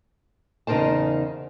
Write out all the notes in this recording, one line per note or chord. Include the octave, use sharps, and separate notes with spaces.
E2 C#3 D#4 A#4 C5 A5